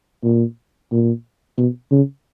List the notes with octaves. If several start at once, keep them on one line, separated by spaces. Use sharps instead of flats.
A#2
A#2
B2
C#3